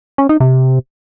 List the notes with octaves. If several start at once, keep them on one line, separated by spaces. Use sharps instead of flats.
C#4
D#4
C3